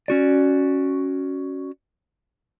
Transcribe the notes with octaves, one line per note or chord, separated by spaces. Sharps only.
C#4 F#4 D5